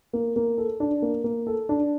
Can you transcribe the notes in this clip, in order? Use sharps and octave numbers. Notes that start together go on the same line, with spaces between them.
A#3
A#3
A4
D4
A#3
A#3
A4
D4